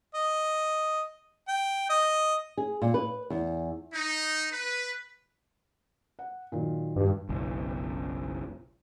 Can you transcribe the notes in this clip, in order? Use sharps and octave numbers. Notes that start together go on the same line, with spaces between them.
D#5
G5
D#5
G#4
A#2
B4
E2
D#4
B4
F#5
A#2 D#3 F#3
G2
F#1 B1